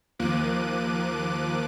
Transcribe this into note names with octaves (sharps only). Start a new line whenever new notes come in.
D#2 F3 A#3 D6 F#6 D#7